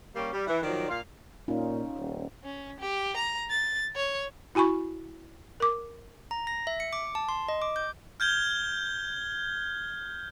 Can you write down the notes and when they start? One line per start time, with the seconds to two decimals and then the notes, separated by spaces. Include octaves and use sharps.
0.15 G3 A#3 C#4 G4
0.32 G3
0.47 E3
0.63 D#3 F3 F#3 D5
0.89 A#2 F4 F5
1.48 A#2 C#4 D#4 F4
1.98 D#1
2.44 C#4
2.80 G4
3.16 A#5
3.50 A6
3.96 C#5
4.55 E4 F#4 G#5 B5 C#6
5.60 A#4 D6
6.31 A#5
6.47 A#6
6.67 E5
6.80 C#7
6.93 D6
7.15 A5
7.29 C6
7.49 D#5
7.62 D6
7.76 G6
8.20 F6 G6 G#6 G7